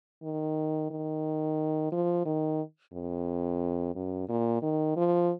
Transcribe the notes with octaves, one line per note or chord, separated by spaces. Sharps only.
D#3
D#3
F3
D#3
F2
F#2
A#2
D#3
F3